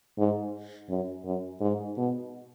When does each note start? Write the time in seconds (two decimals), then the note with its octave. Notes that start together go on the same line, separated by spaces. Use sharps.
0.18 G#2
0.89 F#2
1.25 F#2
1.61 G#2
1.97 B2